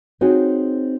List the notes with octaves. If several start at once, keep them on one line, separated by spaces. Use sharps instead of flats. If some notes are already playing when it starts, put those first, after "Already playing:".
C4 D#4 F#4 G#4 C5 C#5